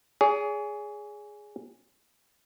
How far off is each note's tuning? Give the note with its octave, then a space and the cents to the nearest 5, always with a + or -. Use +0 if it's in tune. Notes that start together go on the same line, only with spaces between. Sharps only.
G#4 +0 C#5 +45